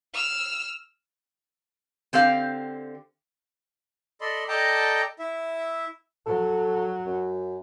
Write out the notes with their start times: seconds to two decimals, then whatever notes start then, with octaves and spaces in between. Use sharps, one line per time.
0.14 E6 F6
2.13 D3 C4 G4 F5
4.21 A4 D5 D#5 B5 C6
4.48 A4 D5 D#5 G5 A5 A#5
5.19 E4 E5
6.26 F#3 A4
7.06 F#2